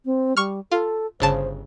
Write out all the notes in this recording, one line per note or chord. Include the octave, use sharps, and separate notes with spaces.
C4
G3 C#6 F6
F4 A4
G1 C#3 C5 A5